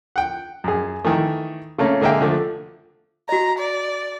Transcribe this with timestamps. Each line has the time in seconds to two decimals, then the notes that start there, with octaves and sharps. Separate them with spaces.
0.16 F#5 G5
0.64 F#2 G#4
1.05 D#3 E3 A3
1.78 C#3 A3 A#3 C#4
2.01 D3 G#3 A#3 E5 G5
2.21 D3 F3 A3
3.29 F#4 D#5 A#5
3.59 D5